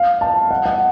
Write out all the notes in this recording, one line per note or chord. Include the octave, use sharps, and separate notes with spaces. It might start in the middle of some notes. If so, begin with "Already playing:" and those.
Already playing: F5
A5
F#5
F#5